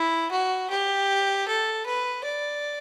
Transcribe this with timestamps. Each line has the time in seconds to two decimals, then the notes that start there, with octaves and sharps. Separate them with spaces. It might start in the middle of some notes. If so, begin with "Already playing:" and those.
Already playing: E4
0.31 F#4
0.70 G4
1.48 A4
1.86 B4
2.24 D5